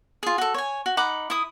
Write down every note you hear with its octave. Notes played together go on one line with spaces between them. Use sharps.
F4 G#4
F#4 A4
C#5 G#5
F#4
D#4 F#5 B5 D6
E4 D#6